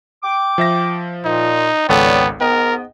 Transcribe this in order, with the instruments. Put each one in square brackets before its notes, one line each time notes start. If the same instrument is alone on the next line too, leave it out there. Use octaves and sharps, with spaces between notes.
[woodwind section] G5 D6
[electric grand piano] F3 E5 A#6
[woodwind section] A#2 [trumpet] D#4
[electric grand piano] G#1 C#2 A4 [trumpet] B3 [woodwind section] C#5 D5 G5
[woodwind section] G#2 B3 [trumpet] A#4 [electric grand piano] D#5 G5